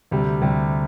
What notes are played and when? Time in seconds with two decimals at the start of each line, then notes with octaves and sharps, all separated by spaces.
0.11 D2 C3 G3
0.42 D2 C3 G3